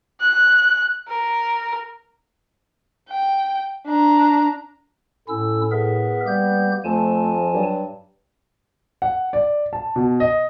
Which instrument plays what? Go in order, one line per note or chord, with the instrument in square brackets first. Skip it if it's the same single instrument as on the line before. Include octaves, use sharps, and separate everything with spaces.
[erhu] F#6
A#4
[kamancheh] G5
D4 A#5
[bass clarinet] A2 [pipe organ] C#4 E4 E6 [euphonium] A4
[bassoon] B3 [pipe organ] G#4 A#4 E5
[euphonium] G3 [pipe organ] A#3 G4 G6
[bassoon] F2 [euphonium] F3 [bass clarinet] A3 [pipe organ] G#5 A5
[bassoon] G2 [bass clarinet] F#3
[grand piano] F#5
D5
A5
B2
D#5